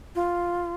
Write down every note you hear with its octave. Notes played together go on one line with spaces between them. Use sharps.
F4